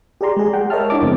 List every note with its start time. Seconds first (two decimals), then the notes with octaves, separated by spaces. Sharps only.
0.21 G4 G#4 D5 A#5 C6
0.37 G#3 G#4
0.53 G#4 F#5 G5
0.70 A#4 C#5 D#5 E5 A5 F6
0.90 D4 E4 D#5 A5 D6
1.02 F2 C#3 G#3 B3 C4